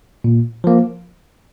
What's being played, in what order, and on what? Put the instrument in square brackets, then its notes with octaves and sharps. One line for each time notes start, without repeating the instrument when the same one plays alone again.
[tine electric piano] A#2
F3 A#3